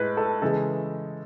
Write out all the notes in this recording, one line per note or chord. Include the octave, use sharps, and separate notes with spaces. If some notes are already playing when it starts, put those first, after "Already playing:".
Already playing: A2 G#3 B4
A4
C#3 E3 G#3 A4